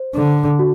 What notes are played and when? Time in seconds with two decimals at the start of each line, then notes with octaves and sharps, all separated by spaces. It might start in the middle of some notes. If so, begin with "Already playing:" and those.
Already playing: C5
0.15 D3
0.59 F#4